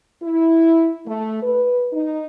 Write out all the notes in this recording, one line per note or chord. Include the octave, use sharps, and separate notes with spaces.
E4
A3
B4
D#4